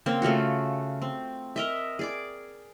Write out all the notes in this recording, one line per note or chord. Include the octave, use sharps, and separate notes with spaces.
C#3 A#3 C4 C5
C#3 A3 F4 F#4
C4
A#4 D#5 E5
G#4 D5 D6